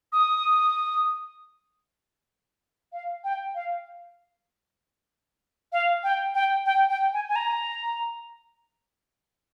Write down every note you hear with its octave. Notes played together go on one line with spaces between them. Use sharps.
D#6
F5
G5
F5
F5
G5
G5
G5
G5
G#5
G#5
A#5